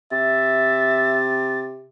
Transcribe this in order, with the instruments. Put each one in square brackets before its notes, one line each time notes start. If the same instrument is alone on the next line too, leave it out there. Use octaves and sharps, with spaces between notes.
[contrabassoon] C3 [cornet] E5 [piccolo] A6